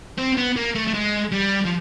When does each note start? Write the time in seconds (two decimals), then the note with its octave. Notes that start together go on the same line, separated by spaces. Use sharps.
0.18 C4
0.37 B3
0.56 A#3
0.75 A3
0.87 A3
0.94 G#3
1.32 G3
1.65 F3